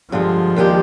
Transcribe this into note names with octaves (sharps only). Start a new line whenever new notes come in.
G2 D3 F3 G#3
D#2 D#3 G#3 D4 G4